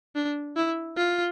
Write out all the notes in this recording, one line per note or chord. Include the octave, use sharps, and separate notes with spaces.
D4
E4
F4